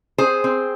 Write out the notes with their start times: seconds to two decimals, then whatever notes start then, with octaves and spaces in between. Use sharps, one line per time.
0.18 C4 G#4 C5
0.44 C4